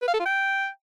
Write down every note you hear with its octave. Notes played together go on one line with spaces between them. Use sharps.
B4
F5
A4
F4
G5